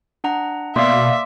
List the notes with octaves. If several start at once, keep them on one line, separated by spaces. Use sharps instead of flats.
D4 F#5 A#5
B2 A#3 D5 E5 F5 C6 D6 D#6